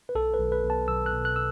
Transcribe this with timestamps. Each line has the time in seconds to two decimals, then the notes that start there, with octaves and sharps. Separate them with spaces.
0.09 B4
0.15 B1 A4
0.34 B4
0.39 B1
0.52 B4
0.64 B1
0.70 A5
0.88 B1 E6
1.06 F#6
1.13 B2
1.25 F#6
1.36 E6